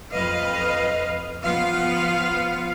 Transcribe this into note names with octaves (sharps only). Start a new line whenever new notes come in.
F2 B4 D#5 F5
F3 B3 F4 F5